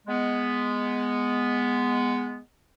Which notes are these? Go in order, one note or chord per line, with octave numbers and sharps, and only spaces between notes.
G#3 B3